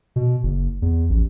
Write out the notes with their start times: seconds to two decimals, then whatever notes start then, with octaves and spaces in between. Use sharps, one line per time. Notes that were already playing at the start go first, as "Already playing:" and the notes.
0.16 B2
0.43 F#1
0.82 E2
1.09 A1